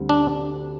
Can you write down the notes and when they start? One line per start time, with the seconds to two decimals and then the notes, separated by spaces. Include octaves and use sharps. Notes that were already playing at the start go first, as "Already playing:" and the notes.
Already playing: D2 D3 G3 C4
0.09 D4